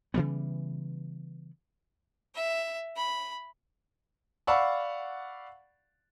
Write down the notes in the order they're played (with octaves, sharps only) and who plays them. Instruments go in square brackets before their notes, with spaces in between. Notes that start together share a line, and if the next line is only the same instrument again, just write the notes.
[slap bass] C#3 E3 G3 B3
[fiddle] E5
B5
[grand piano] D5 F5 F#5 B5 C#6 E6